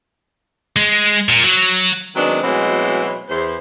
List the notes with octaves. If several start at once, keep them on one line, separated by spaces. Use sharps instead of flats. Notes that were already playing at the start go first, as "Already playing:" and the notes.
G#3
A#2
F#3
D#3 F#3 G#3 B3 C4 D4
B2 E3 F#3 G#3 A3 C4
E2 C5